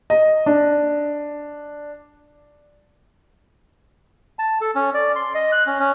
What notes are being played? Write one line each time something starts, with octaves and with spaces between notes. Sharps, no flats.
D#5
D4
A5
A4
C#4
D5
C6
D#5
F#6
C#4
C#4